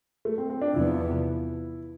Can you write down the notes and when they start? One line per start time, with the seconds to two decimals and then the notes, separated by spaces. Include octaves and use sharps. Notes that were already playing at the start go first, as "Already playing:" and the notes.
0.25 A3
0.38 C4
0.50 C4
0.62 D4
0.74 E2 C3 F3 B3 E4